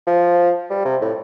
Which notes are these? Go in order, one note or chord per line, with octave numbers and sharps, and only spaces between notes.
F3
G3
C3
A2